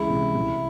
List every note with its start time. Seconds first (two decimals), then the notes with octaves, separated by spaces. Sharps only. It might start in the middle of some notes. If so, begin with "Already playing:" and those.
Already playing: C#2 E3 E4
0.09 C3
0.34 C2